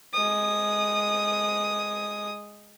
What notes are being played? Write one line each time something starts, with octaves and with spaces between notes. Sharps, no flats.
G#3 D#6